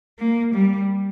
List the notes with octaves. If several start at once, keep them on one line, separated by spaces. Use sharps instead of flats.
A#3
G3